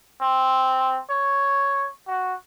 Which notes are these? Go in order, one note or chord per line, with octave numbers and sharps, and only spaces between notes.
C4
C#5
F#4